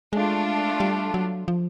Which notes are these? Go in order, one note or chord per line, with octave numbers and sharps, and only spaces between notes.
G#3 A3 D4 F4
G3
F#3
F3